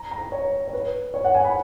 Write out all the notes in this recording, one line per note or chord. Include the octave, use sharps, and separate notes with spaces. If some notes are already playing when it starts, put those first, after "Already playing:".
Already playing: A#5
A#5
C#5
C#5
B4
C#5
F#5
G#5
B5